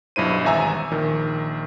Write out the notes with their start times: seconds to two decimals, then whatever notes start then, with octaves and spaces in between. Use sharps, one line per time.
0.16 B1 G2 E4 C5 D#7
0.44 G#1 E2 E5 G#5 A#5 E6
0.91 A#1 D#3